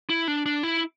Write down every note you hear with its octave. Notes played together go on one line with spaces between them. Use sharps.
E4
D4
D4
E4